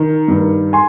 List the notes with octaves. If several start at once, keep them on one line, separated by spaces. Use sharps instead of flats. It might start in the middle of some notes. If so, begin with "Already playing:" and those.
Already playing: D#3
G2 D#3
G#5 C6